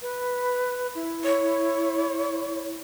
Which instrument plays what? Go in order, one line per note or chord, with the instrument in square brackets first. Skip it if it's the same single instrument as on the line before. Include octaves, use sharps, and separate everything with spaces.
[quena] B4
E4
[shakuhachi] C#5